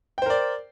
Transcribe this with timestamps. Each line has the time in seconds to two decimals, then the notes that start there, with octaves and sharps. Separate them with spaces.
0.18 G5
0.22 C5
0.26 A#4
0.30 D5